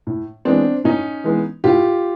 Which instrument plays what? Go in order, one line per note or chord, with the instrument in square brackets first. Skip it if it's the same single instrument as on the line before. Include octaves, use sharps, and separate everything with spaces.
[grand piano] A2
E3 G#3 B3 C4 D4
A2 C#4 D#4
E3 G#3 B3
A2 F4 G4